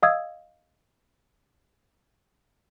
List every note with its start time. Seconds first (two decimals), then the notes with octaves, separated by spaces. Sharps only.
0.03 D#5 F5 D#6 E6 G#6